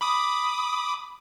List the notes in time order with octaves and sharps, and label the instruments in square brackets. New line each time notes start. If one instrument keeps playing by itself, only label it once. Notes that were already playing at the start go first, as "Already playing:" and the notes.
[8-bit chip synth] B5 D6 D#6